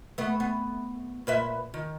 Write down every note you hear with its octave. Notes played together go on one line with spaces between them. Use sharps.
A3 B3
B3
A#2 B4 E5
D#3